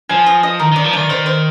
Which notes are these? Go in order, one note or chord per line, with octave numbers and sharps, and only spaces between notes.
F3 G#5
D#5
D#5
D#3 A#4
D#3 D5
F3
D#3 D5
D#3 C5
C5